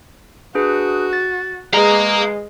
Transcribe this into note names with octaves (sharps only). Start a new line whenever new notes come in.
D4 F#4 G#4 B4
A6
G#3 G#4 B4 F5 A#5